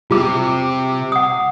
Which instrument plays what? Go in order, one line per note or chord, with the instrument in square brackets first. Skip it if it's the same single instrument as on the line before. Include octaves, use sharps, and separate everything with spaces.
[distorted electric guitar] C3 [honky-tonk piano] G3 D6 [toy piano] F4
[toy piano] F#5 D#6